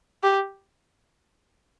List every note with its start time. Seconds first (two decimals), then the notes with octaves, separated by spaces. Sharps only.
0.23 G4